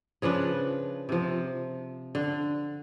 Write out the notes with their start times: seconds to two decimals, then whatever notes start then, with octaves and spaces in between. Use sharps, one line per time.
0.22 C#3 F3 D4 B4
1.09 C3 F3
2.15 D3